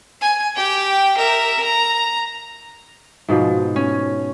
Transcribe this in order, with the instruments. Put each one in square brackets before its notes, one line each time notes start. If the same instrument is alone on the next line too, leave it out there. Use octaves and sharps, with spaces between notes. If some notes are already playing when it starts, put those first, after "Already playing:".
[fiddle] G#5
G4 G5
A#4 E5
A#5
[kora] G#2 B2 F3
[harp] C#4